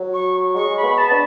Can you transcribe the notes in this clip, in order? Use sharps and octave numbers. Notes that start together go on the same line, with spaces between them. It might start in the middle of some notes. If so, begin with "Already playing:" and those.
Already playing: F#3
C#6
G#3 C#6
B5
B3
A5
D4